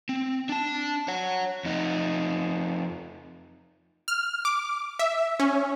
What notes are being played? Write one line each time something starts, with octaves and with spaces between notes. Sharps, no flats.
C4
D4 A5
C#5 F#5
F2 D#4
F6
D6
E5
C#4